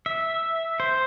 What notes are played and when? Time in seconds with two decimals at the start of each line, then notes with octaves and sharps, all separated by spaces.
0.06 E5
0.80 C5